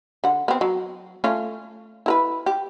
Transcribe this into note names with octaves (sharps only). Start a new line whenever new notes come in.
D3 F#5
B3 C4
F#3
A3 C#4 F4
E4 A#4 B4
G4